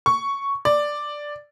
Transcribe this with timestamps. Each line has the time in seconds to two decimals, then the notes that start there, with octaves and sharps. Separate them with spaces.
0.06 C#6
0.65 D5